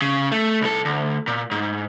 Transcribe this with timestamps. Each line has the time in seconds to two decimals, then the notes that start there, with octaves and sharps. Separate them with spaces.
0.02 C#3
0.32 A3
0.61 C2 A4
0.85 D2
1.27 A#2
1.51 G#2